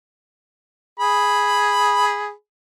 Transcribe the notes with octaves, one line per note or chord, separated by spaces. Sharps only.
G#4 B5